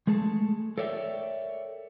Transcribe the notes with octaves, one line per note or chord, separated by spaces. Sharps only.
G#3 A3 G#4 A4 A5
A4 A#4 C#5 D5 E5 G5